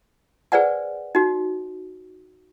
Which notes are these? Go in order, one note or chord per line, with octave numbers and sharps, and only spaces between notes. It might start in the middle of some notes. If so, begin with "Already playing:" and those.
G#4 B4 C5 D5 F#5 G#5
D#4 F#4